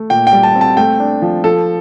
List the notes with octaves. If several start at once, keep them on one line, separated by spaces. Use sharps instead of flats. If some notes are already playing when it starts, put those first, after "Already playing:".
Already playing: A3
A#2 G5
G5
G3
A5
C4
A5
A3 G5
D4
F3
F3 A4